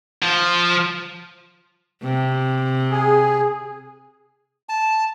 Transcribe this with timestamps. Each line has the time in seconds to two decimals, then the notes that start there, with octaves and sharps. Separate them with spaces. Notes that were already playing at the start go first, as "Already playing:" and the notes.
0.23 F3
2.03 C3
2.91 G#4
4.69 A5